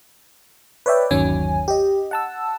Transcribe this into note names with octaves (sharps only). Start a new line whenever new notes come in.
B4 C#5 D5 E5 G5
G1 D#2 D#3 F#3 C#4 G#5
G4 D#5
F#5 A5 E6